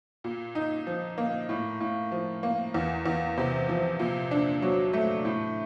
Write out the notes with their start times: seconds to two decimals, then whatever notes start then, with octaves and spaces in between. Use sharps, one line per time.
0.24 A#2
0.55 D#4
0.87 F3
1.18 A#3
1.49 A2
1.80 A2
2.12 F3
2.43 A#3
2.74 E2
3.06 E2
3.37 C3
3.69 F3
3.99 A#2
4.31 D4
4.62 F#3
4.93 A3
5.25 A2